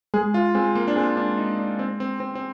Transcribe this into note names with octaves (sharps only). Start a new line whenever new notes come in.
G#3 G#4
F4
G#3 C4
A#3
D4
G#3 C4
D4
D#4
D4
C4
C4
C4
C4